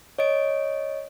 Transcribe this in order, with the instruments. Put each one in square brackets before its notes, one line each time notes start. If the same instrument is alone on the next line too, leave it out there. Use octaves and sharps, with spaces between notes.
[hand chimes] C#5 D#5 D7